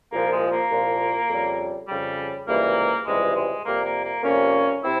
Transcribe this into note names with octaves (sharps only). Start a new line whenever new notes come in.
C2 A#2 F3 A#3
G#3
A#3
C2 A#2 F3
F2 C#3 G3
F2 C#3 G3
C#2 C3 E3 G3 A#3
C#2 C3 E3 G3 G#3
G#3
F2 C3 G3 A#3
A#3
A#3
F2 C3 G3 A#3 C#4
C3 C4 E4